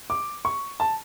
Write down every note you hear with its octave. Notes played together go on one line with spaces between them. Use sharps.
D6
C#6
A5